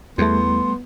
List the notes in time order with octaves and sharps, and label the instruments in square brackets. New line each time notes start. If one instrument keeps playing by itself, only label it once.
[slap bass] E2 [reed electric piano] G3 A3 [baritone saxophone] B3 [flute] C6